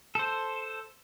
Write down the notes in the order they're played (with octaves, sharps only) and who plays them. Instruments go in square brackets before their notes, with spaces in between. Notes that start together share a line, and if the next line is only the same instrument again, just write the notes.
[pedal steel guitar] A4 C5